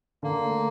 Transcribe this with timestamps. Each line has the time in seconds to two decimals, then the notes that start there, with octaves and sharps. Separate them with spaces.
0.23 D3 A#3
0.42 A3